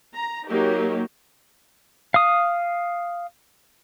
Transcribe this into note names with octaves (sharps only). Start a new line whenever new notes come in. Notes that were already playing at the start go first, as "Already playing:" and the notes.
A#5
F#3 A#3 D#4 G4
F5 D#6